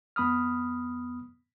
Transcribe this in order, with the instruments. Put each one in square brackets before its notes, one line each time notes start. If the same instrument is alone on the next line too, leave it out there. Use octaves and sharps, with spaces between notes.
[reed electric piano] F2 B3 B5 D#6 F6